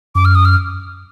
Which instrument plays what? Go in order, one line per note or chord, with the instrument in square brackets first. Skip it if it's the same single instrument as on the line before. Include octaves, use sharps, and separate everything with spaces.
[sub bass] F#2 [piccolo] D6
[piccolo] F6
D#6
F6